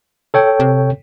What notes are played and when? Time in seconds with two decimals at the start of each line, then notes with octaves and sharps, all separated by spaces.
0.34 A4 C#5 G5
0.60 C3